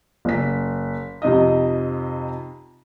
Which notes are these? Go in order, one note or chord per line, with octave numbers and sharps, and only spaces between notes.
F#1 B6
F2 C3 D#4 D#5